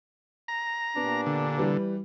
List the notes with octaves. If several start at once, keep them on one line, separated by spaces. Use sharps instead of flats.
A#5
A#2 B3 D4 G4
D3
E3 G3 B4